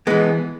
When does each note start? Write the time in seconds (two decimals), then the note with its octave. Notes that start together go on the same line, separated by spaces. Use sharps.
0.07 E3 G#3 B3